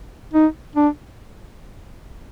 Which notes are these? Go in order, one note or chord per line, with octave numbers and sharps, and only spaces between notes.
D#4
D4